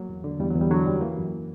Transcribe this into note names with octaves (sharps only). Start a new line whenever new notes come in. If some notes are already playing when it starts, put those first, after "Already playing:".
Already playing: F#3 A#3
E2
D3
E2 G3
F#3
E2
G3
D3 F#3
F#2 G3
E3 A#3
F#2